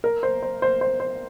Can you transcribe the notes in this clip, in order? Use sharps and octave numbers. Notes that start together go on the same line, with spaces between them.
A#4
C5
C5
C5
C5
C5